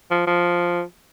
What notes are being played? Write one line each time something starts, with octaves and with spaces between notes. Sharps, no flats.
F3
F3